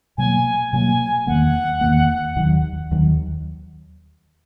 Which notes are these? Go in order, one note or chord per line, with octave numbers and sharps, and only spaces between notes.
B2 F#3 A#3 G#5
B2 F#3 A#3 G#5
E2 D#3 A#3 F#5
E2 D#3 A#3
D#2 D#3 F#3
D#2 D#3 F#3